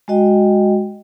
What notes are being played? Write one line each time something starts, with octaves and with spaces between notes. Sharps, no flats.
G#3 F#4 D#5 G5